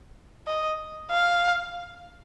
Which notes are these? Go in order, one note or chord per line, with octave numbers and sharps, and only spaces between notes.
D#5
F5